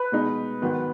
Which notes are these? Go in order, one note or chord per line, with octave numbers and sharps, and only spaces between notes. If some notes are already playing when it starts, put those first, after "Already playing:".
Already playing: B4
B2 G#3 D#4
G#2 D#3 F#3 B3